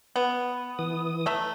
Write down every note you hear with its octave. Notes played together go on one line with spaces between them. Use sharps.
B3
E3 D#6
A3 E5 A#5